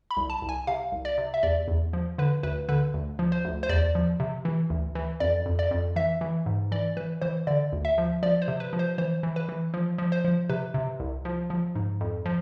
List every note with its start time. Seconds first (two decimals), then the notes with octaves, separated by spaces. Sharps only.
0.11 B5
0.17 C2
0.30 A5
0.42 C2
0.49 G#5
0.67 C3 F5
0.92 C2
1.05 D5
1.18 C3
1.34 E5
1.43 E2 D5
1.68 E2
1.93 F3
2.18 D3 B4
2.43 D2 B4
2.69 D3 B4
2.94 D2
3.19 F3
3.32 C5
3.45 D2
3.63 C5
3.69 E2 D5
3.95 F3
4.20 C3
4.45 E3
4.70 D2
4.95 E3
5.20 F2 D5
5.46 F2
5.59 D5
5.71 F2
5.96 E3 E5
6.21 E3
6.46 G#2
6.72 E3 D5
6.97 E3 B4
7.22 E3 C5
7.47 D3 D5
7.73 D2
7.85 E5
7.98 F3
8.23 F3 D5
8.42 C5
8.48 C3
8.60 B4
8.73 F3
8.79 C5
8.98 E3 C5
9.23 E3
9.36 B4
9.49 E3
9.74 F3
9.98 F3
10.12 C5
10.25 F3
10.50 C3 B4
10.74 C3
11.00 C2
11.25 F3
11.50 F3
11.75 G#2
12.01 F2
12.26 F3